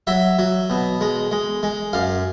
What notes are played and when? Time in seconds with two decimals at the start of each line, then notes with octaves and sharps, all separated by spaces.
0.07 F#3 E5
0.39 F#3
0.70 B2
1.01 G#3
1.31 G#3
1.63 G#3
1.93 F#2 F5